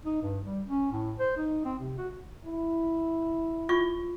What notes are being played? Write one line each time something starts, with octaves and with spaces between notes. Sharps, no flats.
D#4
G2
G3
C#4
A2
C5
D#4
C4
C3
F#4
E4
F4 C#6